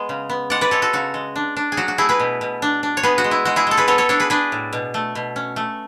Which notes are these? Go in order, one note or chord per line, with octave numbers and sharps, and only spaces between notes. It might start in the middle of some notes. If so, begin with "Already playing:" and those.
Already playing: G#3 B3
C#3
B3
G#3 D5 F#5
B4 D5
G#3 A4 C#5
F#4 A4
C#3 F#4
G#3
D4
D4
G#4
F#3 F#4
F#4
A3 E4 G#4
G#4 B4
B2
B2
D4
D4
C#5
B3 G#4 B4
F#4
G#3
E4
G#3 F#4
E4 G#4
G#3 A4
G#4 B4
B3 A4 C#5
A4 C#5
D4 A4 C#5
G#4 B4
D4 G#4 B4
A2
B2
A3
B2
C#4
A3